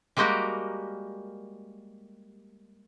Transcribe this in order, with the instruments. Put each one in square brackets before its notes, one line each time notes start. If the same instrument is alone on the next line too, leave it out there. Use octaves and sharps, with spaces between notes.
[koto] G3 G#3 A#3 F#4 G4 A#4